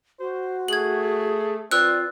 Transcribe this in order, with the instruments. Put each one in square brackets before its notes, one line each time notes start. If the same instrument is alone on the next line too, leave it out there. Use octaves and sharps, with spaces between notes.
[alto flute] F#4 [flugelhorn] C5
[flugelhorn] A3 [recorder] G#4 [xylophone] G#6 F#7
[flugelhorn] C4 [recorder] F4 [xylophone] B4 E6 F#6 [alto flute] D5